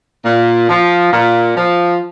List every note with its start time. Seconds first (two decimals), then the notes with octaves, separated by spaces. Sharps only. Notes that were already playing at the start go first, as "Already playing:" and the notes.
0.25 A#2
0.69 F3
1.13 A#2
1.57 F3